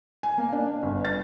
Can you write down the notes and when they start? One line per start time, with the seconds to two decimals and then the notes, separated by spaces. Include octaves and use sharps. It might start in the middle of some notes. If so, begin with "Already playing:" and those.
0.23 G#5
0.38 A#3
0.52 D4
0.68 D4
0.83 G1
1.05 A6